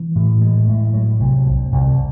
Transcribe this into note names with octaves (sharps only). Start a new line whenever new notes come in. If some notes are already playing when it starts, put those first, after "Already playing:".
Already playing: E3
A2
G#3
A2
F#3
C2
C2
C2